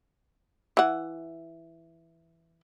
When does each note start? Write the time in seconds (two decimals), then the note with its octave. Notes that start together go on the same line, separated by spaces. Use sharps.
0.77 E3 F#5